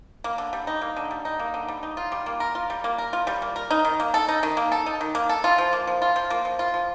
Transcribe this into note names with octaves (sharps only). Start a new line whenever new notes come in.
A#3
D3
G3
D#4
A#3
D3
G3
D#4
A#3
D3
G3
D#4
F4
G3
A#3
A#4
F4
G3
A#3
A#4
F4
G3
A#3
A#4
D#4
D#3
A#3
A4
D#4
D#3
A#3
A4
D#4
D#3
A#3
A4
F4
F3
A#3
F3
F4
F3
A#3
F3
F4
F3